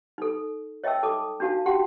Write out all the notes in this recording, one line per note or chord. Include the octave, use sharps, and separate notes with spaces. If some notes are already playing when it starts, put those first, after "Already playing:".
D#4 A4
C#5 D#5 E5 G5 A5 E6
D#4 A4 A5 D6 D#6
D4 D#4 F#4 F5 A5
F#4 G4 F#5 G5 A5 C6